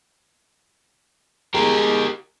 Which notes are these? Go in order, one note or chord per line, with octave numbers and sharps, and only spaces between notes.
G#3 G4 A#4